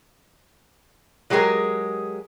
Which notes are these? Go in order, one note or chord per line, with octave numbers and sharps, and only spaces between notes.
F#3 G#3 G4 G#4 A#4